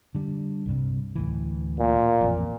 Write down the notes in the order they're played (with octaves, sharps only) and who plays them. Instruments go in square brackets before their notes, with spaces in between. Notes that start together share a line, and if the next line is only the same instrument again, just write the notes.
[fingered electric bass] D3 G3
C2 G2 C3
D2 A2 E3
[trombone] A#2
[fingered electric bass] A1 F2